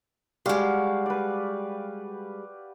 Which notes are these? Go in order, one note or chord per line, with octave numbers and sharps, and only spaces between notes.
G3 G#3 F#4 G4 F5
B4 D5